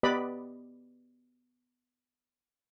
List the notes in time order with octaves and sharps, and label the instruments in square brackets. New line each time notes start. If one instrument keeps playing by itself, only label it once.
[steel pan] B3 G4 B4 D5 D#5 B5